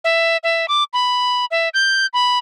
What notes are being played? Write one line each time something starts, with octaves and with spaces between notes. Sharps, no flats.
E5
E5
D6
B5
E5
G6
B5